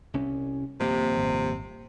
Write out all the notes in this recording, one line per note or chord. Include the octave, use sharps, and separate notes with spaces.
C2 C#4
D#1 F2 C3 A#3
G#1